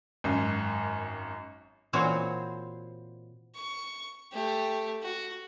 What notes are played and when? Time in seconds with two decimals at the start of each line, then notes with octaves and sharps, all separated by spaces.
0.24 G#1 F#2
1.93 A#2 E3 C4 F#4 C5 C#5
3.55 C#6
4.33 A3 G4
5.02 F#4